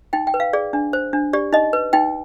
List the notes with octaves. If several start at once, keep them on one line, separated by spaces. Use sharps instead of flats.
D#4 G5
G5
B4
F5
G#4 D5
D4
C5
D4
G4 D5
D#4 D#5
B4
D#4 G5